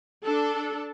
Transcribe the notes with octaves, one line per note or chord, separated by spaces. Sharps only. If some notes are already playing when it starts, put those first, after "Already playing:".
D4 A4